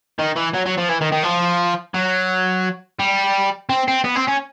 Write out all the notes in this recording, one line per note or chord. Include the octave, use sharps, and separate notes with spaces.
D#3
E3
F#3
F#3
F3
E3
D#3
D#3
F3
F#3
G3
C4
C4
B3
C4
C#4